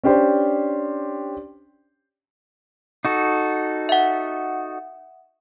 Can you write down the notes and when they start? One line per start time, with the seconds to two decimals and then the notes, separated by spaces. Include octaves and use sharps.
0.04 C#4 D4 G4 C5
3.05 D#4 F#4 A4
3.89 E5 F#5